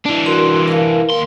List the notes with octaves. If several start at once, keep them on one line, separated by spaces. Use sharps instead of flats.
E3 D4
F#4 A#4 C6
A#4 F5
D#2 C6